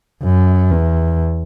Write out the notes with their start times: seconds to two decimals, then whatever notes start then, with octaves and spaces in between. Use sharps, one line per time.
0.23 F#2
0.71 E2